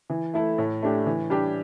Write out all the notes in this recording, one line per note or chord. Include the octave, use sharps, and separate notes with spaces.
E3
A3 E4 A4
A2
A3 D4 G4
E3
G3 D4 G4